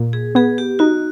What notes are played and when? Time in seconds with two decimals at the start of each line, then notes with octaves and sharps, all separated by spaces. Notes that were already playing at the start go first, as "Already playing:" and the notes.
Already playing: A#2
0.13 G#4
0.35 B3 G#4
0.58 G4
0.79 D#4 F#4